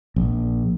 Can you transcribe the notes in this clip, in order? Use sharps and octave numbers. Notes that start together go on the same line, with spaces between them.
A#1